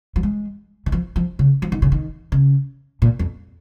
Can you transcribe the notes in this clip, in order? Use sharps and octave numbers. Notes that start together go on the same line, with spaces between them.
F3
G#3
D#3
F3
F3
C#3
F3
D#3
C#3
D#3
C#3
A#2
F2